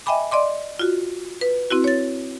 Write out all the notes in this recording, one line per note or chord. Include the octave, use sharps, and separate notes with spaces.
D#5 E5 G5 G#5 B5 D6
D5 D#5 C6 D6
F4 F#4
B4
C4 E4 F#4
C#5 A6